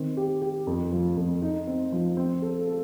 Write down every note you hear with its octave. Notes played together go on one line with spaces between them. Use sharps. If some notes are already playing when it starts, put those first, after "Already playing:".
Already playing: D#3 C4
G4
G4
F2
F3
F2
D#4
C4
F3
C4
A4
A4